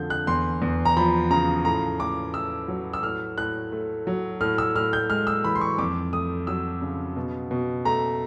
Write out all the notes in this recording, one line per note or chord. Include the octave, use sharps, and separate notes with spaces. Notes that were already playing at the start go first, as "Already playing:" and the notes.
Already playing: F2 D3 F3 A3 G6
F#6
E2 C6
E2
A#5
F3 B5
C#3 A#5
A2 A#5
A2 D6
A3 E6
F#3
E6
A2 F6
A2 F#6
A3
F#3
A2 F6
E6
A2 F6
G6
G#3 F6
E6
E3 B5
C6
C#6
F2 D6
A3 D#6
F#3 E6
C#3
B2
B2
A3 A#5